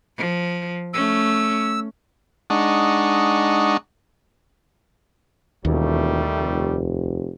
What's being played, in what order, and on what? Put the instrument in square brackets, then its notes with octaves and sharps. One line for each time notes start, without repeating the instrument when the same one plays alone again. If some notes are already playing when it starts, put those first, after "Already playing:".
[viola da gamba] F3
[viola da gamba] A3 C#4 [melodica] E6
[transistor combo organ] G#3 D4 D#4 F#5 C#6
[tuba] E1 [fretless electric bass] D#2 [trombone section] D#3 G3 A3
[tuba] F1